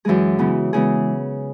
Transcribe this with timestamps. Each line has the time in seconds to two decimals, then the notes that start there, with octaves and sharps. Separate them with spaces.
0.05 F#2 E3 G#3 G#4
0.39 C#3 E3 B3 E4
0.73 C#3 E3 G#3 B3 G#4